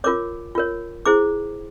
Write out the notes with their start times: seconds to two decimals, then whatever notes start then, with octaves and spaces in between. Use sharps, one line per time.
0.04 F4 A#4 C#5 D6
0.55 F4 A#4 C#5
1.06 E4 G#4 C5 D6